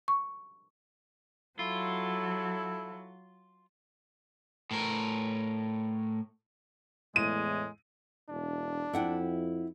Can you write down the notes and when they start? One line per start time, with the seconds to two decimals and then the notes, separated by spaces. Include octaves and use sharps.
0.08 C#6
1.59 F#3 E4 F4 A4
4.71 A2 A#4
7.16 E2 A2 G#3 D#7
8.29 E1 D4
8.93 F2 E4 F#5 G5